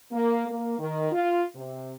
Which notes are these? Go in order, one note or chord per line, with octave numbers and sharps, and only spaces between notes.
A#3
A#3
D#3
F4
C3